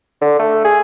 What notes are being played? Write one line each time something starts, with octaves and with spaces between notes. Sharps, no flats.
D3
A3
G#4